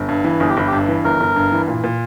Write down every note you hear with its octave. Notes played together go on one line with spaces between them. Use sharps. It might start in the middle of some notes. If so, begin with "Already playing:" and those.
Already playing: G1
G2
E3
G1 G#4
G4
G1 E4
G4
G2
E3
G1 A#4
G1
G2
E3
A#2
A#2